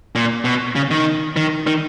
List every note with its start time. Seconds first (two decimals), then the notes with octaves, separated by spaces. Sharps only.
0.15 A#2
0.45 B2
0.76 C#3
0.91 D#3
1.36 D#3
1.67 D#3